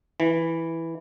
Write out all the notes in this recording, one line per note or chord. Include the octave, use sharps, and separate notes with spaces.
E3